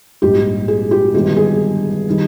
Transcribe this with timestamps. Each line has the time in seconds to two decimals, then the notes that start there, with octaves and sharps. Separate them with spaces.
0.22 A#1 G#2 G3 G4
0.68 G#4
0.91 G4
1.14 G1 G2 D#3 G#3 G4
1.37 G#4
2.09 D#3 G3